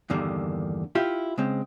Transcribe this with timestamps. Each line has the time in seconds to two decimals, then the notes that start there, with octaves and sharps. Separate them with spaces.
0.10 E2 G2 D3 D#3 A#3
0.95 E4 F4 G4 E5
1.38 C#3 G#3 C4